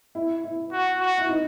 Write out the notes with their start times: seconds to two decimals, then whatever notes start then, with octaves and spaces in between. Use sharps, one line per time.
0.15 E4
0.44 E4
0.72 F#4
1.00 F#4
1.18 E4
1.29 D#4